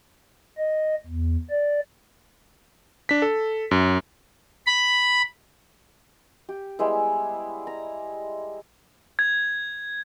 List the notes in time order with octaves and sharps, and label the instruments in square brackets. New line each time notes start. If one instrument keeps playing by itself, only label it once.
[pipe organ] D#5
E2
D5
[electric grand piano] D4 B6
A4
F#2
[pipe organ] B5
[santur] G4
G3 G#3 B3 E4
A#5
[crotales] G#6